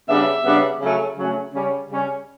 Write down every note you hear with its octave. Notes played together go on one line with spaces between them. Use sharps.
C#3 G3 B3 D4 E5
C#3 G3 B3 D4
C#3 F#3 A3 C#4
C#3 F#3 A3 C#4
C#3 G3 C#4
C#3 G3 C#4